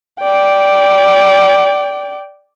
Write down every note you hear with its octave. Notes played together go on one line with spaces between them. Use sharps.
D5 G5